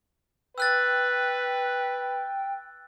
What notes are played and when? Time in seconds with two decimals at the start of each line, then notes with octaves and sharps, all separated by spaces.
0.58 B4 G5 E6 F#6 A6